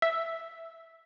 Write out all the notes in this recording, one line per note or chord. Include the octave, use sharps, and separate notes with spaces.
E5